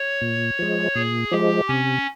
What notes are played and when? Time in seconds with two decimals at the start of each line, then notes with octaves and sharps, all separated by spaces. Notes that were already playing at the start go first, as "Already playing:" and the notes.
Already playing: C#5
0.21 A#2
0.59 F3 G#3
0.95 A#2 G#4
1.31 F3 G#3 G4
1.68 C3 C#4